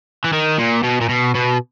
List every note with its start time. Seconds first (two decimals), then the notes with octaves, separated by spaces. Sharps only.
0.24 E3
0.33 D#3
0.59 A#2
0.83 B2
1.01 A#2
1.09 B2
1.35 B2